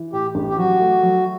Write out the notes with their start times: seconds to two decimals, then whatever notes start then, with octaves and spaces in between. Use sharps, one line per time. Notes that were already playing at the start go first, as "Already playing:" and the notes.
Already playing: E3
0.13 A2 G4
0.35 A1
0.49 G4
0.57 F#3 F#4
0.80 A3
1.03 F#3